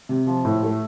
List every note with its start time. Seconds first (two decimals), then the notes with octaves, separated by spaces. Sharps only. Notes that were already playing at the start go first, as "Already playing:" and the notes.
0.09 C3
0.27 F3
0.45 A2
0.62 A3